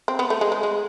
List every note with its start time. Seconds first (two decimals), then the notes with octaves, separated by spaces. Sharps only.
0.08 C4
0.19 B3
0.30 A3
0.41 G#3
0.52 G#3
0.63 G#3